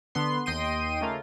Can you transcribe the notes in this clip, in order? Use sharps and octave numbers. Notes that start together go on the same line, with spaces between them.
D3 B3 C6
D#2 D#5 G5 C6 D#7
C#3 A3 A#3 F4